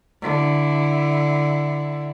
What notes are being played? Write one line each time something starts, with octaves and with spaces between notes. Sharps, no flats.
D3 E4